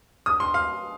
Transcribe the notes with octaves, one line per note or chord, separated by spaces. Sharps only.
D#6
C6
F5